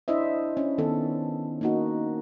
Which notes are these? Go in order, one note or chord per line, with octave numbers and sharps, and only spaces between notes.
D4 E4 C5 D#5 E5
C#4
D#3 B3 A4
A#3 D#4 F#4